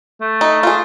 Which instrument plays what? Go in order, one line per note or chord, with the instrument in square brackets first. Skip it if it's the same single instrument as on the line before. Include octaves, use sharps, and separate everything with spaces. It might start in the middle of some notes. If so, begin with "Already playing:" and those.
[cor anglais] A3
[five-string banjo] D#4
F4 G#4